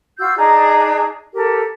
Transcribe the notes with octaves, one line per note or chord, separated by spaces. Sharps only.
F4 F#4 E6 G6
D4 D#4 G#4 A#5
G4 A4 A#4